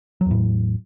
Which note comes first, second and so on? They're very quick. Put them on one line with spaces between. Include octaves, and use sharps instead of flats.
F#3 E2 A2